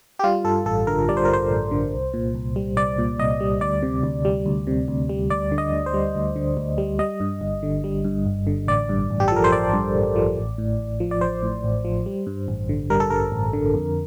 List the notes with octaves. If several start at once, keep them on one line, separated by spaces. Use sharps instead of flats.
G4
G3 F4
G2 A4
A1 A4
D3 A#4
G3 D5
C5
A#4
G2 C5
A1
D3
C2
A#2
C2
G3
C2 D5
A#2
C2 D#5
G3
D2 D5
C3
D2
G3
D2
C3
D2
G3
D2 D5
D3
D#5
D2
C5
G3
D2
D3
D2
G3
G3 D#5
G2
G1
D3
G3
G2
G1
D3
A1 D5
G2
A1
G4
A4
F3 A#4
C5
A1 D5
G2
A1
F3
A1
A2
A1
F3
D5
A1 C5
A2
A1
F3
G3
G2
A1
D3
G3 A#4
A4
G2 A#4
A1
D3
F2